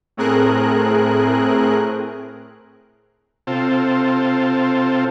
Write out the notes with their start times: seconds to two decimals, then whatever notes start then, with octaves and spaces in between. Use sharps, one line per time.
0.17 A2 A3 C4 G#4 A#4 F#6
3.47 C3 C4 F4 A4